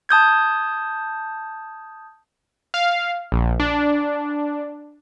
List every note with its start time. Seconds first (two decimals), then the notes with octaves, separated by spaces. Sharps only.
0.09 A5 D#6 G6 G#6
2.74 F5
3.32 A#1
3.60 D4